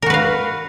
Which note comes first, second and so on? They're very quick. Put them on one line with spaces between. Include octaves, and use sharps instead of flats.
A#4 F#4 B4 F5